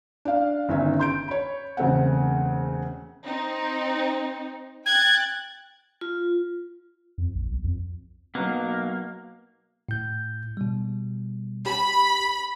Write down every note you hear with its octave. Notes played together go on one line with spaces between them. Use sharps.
D4 F5
G1 D#3 C#4 E5
C6 G6 D7
C#5 B5
E1 C#3 A3 C4 F#5
C4 D#4
G5 F#6 G#6 A6
F4
F2
A#1
B1
F2
B2 F#3 A#3
A2 G6
B2 G3
G4 B5